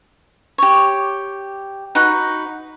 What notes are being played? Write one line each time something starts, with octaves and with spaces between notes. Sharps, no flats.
G4 C#5
D#4 F#4 B4